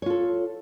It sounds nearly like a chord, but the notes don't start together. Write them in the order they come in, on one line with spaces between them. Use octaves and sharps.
C#5 F4 A4